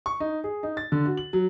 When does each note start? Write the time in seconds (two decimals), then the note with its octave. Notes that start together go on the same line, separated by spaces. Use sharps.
0.06 C#6
0.20 D#4
0.44 G#4
0.63 D#4
0.77 A6
0.92 D3
1.05 F#4
1.17 F#7
1.33 F#3